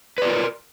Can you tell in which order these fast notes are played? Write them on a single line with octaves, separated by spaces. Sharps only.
B4 D5 F4 A#4